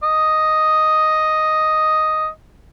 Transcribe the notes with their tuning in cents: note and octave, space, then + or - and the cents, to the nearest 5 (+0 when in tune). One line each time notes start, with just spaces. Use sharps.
D#5 +0